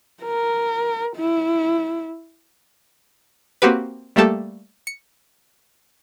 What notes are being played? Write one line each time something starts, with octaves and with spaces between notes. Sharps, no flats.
A#4
E4
A#3 C4 F#4 G4 B4
G3 A3 A#3 G4 A4
C#7